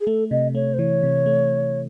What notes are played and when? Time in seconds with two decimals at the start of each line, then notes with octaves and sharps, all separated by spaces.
0.01 G#4
0.07 A3 A4
0.31 C3 D#5
0.55 A3 C#5
0.74 C5
0.79 E3 C#5
1.03 C3
1.26 A3